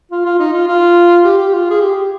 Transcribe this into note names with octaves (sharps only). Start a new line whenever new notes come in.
F4
F4
D#4
F4
F4
G4
G4
F4
G#4
G4